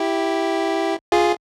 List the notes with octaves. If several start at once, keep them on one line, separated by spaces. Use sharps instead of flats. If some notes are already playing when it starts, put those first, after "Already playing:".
Already playing: E4 G4
F4 G#4